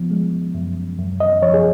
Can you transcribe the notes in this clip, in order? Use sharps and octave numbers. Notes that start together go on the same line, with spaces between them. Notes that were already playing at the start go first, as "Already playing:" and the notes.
Already playing: F3 B3
G#3
F#2
F#2
D#5
F3 C#5
G#4